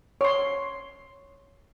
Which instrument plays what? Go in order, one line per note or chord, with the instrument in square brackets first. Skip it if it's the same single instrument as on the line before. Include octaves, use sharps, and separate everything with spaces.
[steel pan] C#5 C6